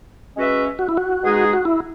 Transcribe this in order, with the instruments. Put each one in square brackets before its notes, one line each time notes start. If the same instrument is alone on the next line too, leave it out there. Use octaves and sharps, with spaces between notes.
[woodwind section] G#3 C#4 F#4 B4 E5
[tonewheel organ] F#4
E4
F#4
[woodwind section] B2 G#3 D#4 G#4
[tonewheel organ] F#4
E4